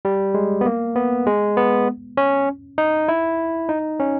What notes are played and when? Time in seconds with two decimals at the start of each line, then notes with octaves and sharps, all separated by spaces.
0.05 G3
0.34 G#3
0.61 B3
0.66 A#3
0.96 B3
1.27 G#3
1.57 B3
2.17 C#4
2.78 D#4
3.08 E4
3.69 D#4
4.00 C#4